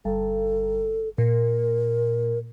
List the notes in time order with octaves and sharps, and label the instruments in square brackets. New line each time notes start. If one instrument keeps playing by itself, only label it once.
[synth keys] G1 [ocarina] A4
[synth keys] A#2 [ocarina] A#4